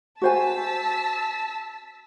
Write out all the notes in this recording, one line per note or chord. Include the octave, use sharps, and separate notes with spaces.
F#4 C5 G#5 A5 E6 B6